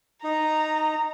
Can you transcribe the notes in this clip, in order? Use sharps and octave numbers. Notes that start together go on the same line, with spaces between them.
D#4 A#5